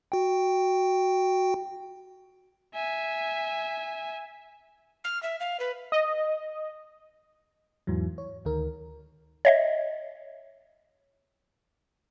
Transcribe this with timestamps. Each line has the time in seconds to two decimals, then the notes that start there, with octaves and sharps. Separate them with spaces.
0.12 F#4 G5
2.75 E5 G#5
5.04 F6
5.23 E5
5.40 F5
5.60 B4
5.92 D#5
7.87 E2 G#2 E3 F#3
8.18 C#5
8.45 D2 D#3 A#4
9.45 C#5 D#5 E5